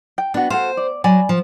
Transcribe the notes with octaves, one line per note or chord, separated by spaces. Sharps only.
G5
B3 D4 F#4
F#4 A4 C5 F5
D5
F#3 D5 G#5 B5
F3